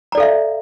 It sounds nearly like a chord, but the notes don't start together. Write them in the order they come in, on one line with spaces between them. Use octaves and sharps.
A#5 D5 A4 F5 E5